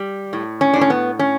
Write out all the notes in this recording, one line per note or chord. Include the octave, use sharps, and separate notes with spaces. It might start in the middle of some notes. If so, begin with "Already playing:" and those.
Already playing: G3
A2
C#4
A2 D4
C#4
B3
C#4